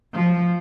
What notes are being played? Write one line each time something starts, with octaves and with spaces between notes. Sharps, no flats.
F3